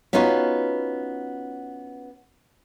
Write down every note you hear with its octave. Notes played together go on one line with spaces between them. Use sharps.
B3 C#4 D#4 F4 F#4 B4